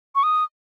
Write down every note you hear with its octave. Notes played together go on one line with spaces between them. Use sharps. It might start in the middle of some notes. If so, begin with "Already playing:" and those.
C#6
D#6